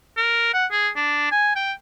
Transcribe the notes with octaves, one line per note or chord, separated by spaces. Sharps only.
A#4
F#5
G#4
D4
G#5
G5